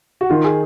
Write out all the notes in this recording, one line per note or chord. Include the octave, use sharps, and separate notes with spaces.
F#4
D#3 F4
G#4